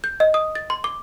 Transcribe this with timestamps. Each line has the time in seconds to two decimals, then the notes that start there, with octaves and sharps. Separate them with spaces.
0.04 G6
0.20 D#5
0.34 D#6
0.55 A6
0.70 C6
0.84 D6